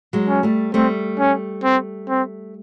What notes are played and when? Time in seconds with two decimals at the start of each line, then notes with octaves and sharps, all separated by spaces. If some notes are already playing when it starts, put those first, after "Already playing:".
0.13 F#3 G#3
0.29 C#4
0.43 G3 A3
0.74 G3 A3 C4
1.19 C#4
1.64 C4
2.09 C4